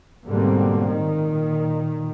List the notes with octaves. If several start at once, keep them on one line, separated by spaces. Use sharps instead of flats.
G#2 B2 D3 G3 A#3 C4
A#2 D#3